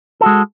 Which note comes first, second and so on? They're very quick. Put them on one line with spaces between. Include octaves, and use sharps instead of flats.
A4 F#4 G#3